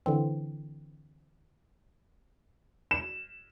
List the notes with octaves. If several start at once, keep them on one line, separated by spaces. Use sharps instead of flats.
D3 E3 C4
E7